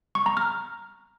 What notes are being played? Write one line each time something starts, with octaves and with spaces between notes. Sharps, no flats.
C#6
A#5
F6